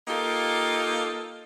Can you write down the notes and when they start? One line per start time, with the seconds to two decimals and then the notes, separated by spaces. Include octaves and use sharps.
0.08 A#3 D#4 F4 G4 A4